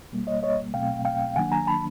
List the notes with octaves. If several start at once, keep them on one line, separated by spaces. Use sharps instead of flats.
B2 G3 A#3
C#5 D#5
C#5 D#5
B2 F#3 A3 C4 F5 G5
F5 G5
D#3 F#3 A#3 D4 F#5 G#5
G#5 A#5
A5 B5